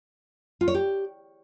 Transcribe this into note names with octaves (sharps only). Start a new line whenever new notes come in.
F4
C#5
G4